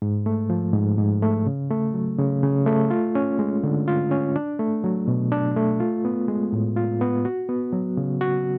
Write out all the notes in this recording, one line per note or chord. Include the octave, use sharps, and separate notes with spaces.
G#2
A3
F3
G#2
G#2
A3
C#3
A3
F#3
C#3
C#3
A3
F4
C#4
G#3
D3
F4
C#4
D4
A3
F#3
B2
D4
A3
F4
B3
G#3
A2
F4
B3
F#4
B3
F#3
C#3
F#4